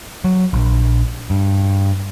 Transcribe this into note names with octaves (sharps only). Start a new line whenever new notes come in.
F#3
A#1
G2